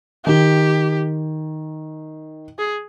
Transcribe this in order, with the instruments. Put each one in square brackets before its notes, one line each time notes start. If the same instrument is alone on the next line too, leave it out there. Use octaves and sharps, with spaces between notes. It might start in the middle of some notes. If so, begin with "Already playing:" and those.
[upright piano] D#3 [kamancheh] G4
[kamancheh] G#4